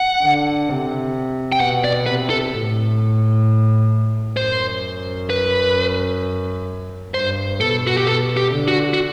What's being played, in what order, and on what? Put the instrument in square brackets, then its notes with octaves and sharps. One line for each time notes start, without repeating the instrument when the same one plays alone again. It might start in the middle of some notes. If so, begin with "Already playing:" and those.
Already playing: [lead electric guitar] F#5
[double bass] D3
C3
[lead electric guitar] G5
[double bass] B2 [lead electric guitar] F#5
[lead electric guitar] D5
[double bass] C3 [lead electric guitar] B4
[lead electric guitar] A4
[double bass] A2
[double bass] F#2 [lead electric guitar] C5
[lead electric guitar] B4
[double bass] G2 [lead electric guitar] C5
[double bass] B2 [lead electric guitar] A4
[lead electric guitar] F#4
G4
[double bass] B2 [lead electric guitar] A4
[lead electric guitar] G4
[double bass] D3
[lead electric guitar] F#4
F#4